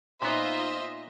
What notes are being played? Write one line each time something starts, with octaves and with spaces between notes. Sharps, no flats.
A#2 B3 D#4 F4 C5 D#5 E5